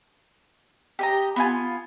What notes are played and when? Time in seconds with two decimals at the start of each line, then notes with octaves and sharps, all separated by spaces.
0.99 G4 D#5 A#5
1.36 B3 F4 G#5